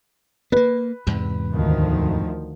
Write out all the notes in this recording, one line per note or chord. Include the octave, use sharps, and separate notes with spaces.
A#3 B3 B4
E2 G#2 C3
D2 D#3 F3